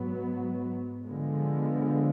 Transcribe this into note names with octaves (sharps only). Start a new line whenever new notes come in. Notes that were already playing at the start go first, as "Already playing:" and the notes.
Already playing: G#2 F#3 B3
D3 F3 G#3 B3